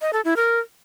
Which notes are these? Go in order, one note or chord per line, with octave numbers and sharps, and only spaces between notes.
D#5
A4
E4
A#4